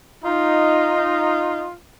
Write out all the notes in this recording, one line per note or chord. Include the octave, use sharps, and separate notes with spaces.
D#4 F4